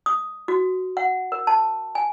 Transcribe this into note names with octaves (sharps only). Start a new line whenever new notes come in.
D#6
F#4
F#5
A#4
A5
G#5